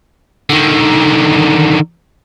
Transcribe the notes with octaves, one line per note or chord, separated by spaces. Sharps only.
D3 D#3